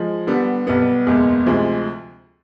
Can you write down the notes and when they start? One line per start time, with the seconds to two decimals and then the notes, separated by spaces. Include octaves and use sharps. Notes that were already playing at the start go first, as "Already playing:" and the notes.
Already playing: F3 G#3
0.27 D3 G3 B3
0.67 B1 B2 G3 B3
1.07 F#1 E2 B2 G#3
1.46 D2 C3 F3 G#3